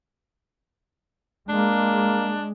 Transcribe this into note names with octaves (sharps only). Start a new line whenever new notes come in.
G#3 A#3 D4